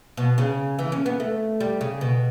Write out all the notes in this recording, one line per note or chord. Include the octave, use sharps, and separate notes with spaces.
B2
C#3
E3
C#4
B3
A3
G3
C#3
B2